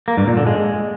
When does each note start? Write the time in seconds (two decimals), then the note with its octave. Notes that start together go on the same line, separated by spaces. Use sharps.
0.08 A#3
0.17 G2
0.27 A#2
0.37 D3
0.47 G#3